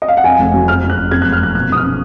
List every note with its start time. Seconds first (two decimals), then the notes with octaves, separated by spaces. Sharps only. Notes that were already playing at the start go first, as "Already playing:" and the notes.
0.02 D#5
0.08 F5
0.17 F#5
0.24 F2 G#5
0.39 F1
0.54 F#3
0.68 F2 F6
0.82 F#1
0.90 F#6
0.97 F#1
1.11 F2 G#6
1.22 F1 F#6
1.32 F6
1.40 F1 F#6
1.54 B2 F#6
1.69 B1 D#6
1.77 F6
1.83 C#4